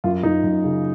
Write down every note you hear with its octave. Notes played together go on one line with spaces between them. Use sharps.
F#2 F4
F#2 D#4
F#2
C#3